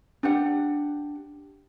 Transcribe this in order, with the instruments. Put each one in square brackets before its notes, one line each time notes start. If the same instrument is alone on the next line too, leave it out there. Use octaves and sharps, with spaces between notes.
[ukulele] D4 G4 F#5